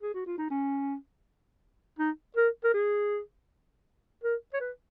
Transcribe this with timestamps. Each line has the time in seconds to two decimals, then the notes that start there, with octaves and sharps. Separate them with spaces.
0.02 G#4
0.14 F#4
0.26 F4
0.38 D#4
0.50 C#4
1.99 D#4
2.37 A#4
2.64 A#4
2.74 G#4
4.24 A#4
4.54 C#5
4.60 B4